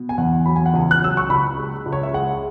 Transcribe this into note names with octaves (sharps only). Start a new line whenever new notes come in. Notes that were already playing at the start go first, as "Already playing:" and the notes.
Already playing: B2
G#5
E2 F#5
F#3 B5
G#5
F#5
C#2 G#5
F#6
F#3 E6
C#6
C#2 B5
G#3
C#2
C#5
E5
G#3 F#5